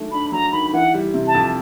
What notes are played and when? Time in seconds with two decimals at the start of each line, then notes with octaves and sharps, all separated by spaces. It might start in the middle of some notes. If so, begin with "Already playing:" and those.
Already playing: D#3 F#3 A3 D4
0.12 D4 B5
0.32 F#3 A#5
0.52 D#3 B5
0.73 E3 F#5
0.94 G3
1.14 C3
1.27 A5
1.34 F2